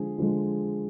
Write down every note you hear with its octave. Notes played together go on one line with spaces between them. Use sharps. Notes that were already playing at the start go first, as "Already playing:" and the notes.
Already playing: D3 F3 G#3 G#4
D3 F3 G#3